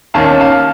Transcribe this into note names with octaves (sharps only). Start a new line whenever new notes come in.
D#2 D#3 A#3 C#4 F5 A5
F5 A5